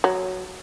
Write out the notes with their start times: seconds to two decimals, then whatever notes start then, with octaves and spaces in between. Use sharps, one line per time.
0.04 F#3